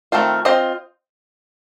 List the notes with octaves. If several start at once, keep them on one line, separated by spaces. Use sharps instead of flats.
D#3 A3 C4 F4
C4 F4 C5 D#5